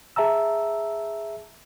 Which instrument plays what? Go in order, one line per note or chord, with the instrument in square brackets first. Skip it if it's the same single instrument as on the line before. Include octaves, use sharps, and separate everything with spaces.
[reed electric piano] G#4 E5 A5 A#5 E6